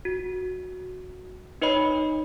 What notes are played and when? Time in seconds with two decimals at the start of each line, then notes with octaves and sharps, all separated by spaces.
0.05 F#4
1.62 D#4 B4 C#5 D#5 B5